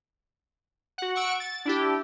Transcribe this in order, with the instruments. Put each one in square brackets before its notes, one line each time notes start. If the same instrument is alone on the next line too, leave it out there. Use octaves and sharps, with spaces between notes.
[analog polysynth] F#4 F#5
F#5 C#6 E6 D7
A6
D4 E4 G4